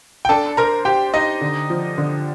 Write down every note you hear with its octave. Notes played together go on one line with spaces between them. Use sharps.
G5
D4 A4 A5
A#4 C5 A#5
G4 C5 G5
D#4 G4 D#5
D3
F3
D3